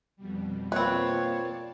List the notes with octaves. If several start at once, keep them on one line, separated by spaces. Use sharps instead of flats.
F2 B2 G3
A#3 C4 F4 B4 C#5 D5 A5